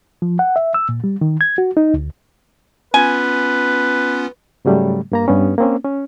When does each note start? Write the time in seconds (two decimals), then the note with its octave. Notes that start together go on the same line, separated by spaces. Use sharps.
0.22 F3
0.39 F#5
0.56 E5
0.74 E6
0.89 A#2
1.04 G3
1.21 D#3
1.41 G#6
1.58 F#4
1.77 D#4
1.94 D2
2.94 B3 C#4 F4 B4 G#5
4.65 G#2 C#3 F#3 G3 A3
5.12 G2 A#3 A#5
5.28 G2 B3 C#4
5.58 A#3 C4 C#4
5.85 C#4